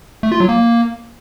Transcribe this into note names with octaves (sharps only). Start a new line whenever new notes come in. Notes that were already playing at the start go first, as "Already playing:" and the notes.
A3
F4
F#3
A#3